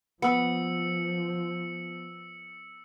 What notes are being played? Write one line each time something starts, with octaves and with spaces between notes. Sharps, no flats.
F3 B3 E6 C#7